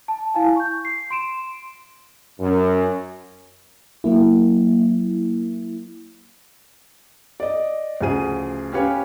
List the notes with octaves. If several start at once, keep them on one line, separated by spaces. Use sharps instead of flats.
A5
E4 F5 G#5
C#6 G6
C7
C6 D7 E7
F#2
F#3 A#3 E4
D5 D#5
D2 C#3 F3 G#4 D#7
C#4 G4 B4 C#5 F5 G#5